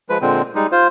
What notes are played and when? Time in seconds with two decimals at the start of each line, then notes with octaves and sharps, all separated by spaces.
0.09 F3 G#3 B4
0.22 A#2 D3 G#3 C4
0.55 G3 G#3 D#4
0.72 F4 C5